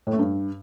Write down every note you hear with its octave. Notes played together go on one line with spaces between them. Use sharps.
A2
A3
G2